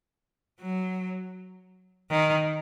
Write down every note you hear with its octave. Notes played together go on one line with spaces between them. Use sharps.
F#3
D#3